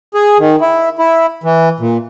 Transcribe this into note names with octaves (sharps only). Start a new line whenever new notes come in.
G#4
D#3
E4
E4
E3
A#2